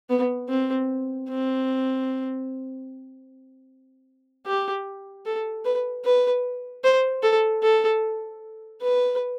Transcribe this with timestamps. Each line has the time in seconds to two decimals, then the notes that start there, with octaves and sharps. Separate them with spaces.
0.09 B3
0.49 C4
1.29 C4
4.46 G4
5.26 A4
5.65 B4
6.05 B4
6.84 C5
7.23 A4
7.63 A4
8.81 B4